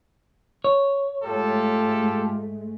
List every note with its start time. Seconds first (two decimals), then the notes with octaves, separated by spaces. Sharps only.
0.64 C#5
1.23 G#2 G#3 A3 F4 G4 A4